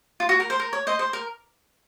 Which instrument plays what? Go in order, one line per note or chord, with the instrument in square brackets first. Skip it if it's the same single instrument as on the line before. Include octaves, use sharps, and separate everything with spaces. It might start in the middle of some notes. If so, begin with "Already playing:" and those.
[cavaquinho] F4
F#4
A#4
C5
A#4
C#5
C5 D#5
C5
A#4